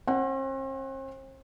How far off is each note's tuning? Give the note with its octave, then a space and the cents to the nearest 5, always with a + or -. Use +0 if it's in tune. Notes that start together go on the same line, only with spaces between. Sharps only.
C4 +45 F#5 +5